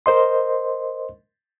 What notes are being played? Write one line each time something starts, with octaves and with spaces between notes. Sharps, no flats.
A#4 C5 D#5 C6